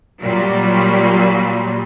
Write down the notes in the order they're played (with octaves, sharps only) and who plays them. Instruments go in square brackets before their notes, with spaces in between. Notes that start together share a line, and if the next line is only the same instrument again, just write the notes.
[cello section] A#2 F#3 G3